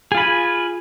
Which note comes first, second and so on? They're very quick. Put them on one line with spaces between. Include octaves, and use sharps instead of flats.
G#4 F4 B5 G#5